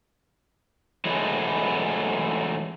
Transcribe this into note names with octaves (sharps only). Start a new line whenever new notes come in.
E3 F#3 G#3 A3